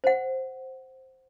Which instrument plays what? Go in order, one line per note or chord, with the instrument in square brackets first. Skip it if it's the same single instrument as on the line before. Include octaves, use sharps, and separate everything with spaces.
[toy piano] C5 F#5